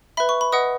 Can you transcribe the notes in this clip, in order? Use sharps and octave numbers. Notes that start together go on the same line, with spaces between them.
B4 E5 B5
C#6
B5
B4 D#5 F#5 D#6